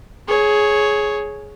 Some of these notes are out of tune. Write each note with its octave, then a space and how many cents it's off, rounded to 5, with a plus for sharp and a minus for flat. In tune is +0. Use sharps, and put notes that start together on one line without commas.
G#4 +15 C#5 +0